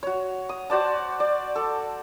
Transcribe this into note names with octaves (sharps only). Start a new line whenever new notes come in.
F#4 C#5
D#6
F#4 C5 D5 A5
D5
A4